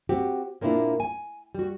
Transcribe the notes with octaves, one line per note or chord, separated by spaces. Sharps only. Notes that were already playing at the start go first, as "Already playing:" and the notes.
C4 F#4 G4
A#2 A#3 C4 D4 E4 F4
G#5
G3 F#4